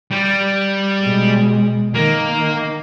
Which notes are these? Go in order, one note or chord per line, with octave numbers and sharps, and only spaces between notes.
G3
B2 G#3
D#3 A#3